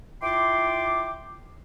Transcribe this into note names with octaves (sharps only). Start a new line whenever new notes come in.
E4 F4 G5 C6 D6